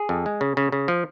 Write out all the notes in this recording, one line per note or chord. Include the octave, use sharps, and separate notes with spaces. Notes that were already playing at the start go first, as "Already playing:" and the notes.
Already playing: G#4
F2
G#3
C#3
C#3
C#3
F3